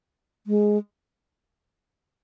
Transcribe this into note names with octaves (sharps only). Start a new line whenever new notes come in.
G#3